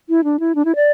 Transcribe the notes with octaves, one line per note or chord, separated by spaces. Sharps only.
E4
D4
E4
D4
E4
D5